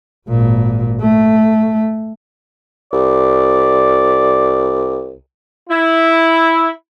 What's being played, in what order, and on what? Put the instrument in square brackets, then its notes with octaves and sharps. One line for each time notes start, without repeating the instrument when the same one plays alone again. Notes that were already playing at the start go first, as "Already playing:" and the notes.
[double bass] G#1 A#2
A3
[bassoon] C2 [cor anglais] D5
[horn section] E4